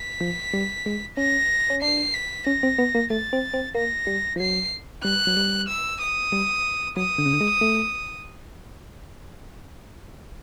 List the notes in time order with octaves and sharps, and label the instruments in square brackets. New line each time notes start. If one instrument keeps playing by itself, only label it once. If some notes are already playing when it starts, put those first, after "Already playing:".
Already playing: [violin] B6
[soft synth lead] F3
G3
G#3
[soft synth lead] C#4 [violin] A#6
[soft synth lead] C#4
[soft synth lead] D4 [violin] C7
[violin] B6
[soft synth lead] C#4 [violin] A#6
[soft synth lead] C4
B3
A#3
[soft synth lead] A3 [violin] A6
[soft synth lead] C4
C4
[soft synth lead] A#3 [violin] A#6
[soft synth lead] G3
F3
[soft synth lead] F#3 [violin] C7
[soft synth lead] G3 [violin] F#6
[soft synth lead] F#3
G3
[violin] E6
D#6
[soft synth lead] G3
[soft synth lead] F#3 [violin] D#6
[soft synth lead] D3
C#3
D3
G#3
A3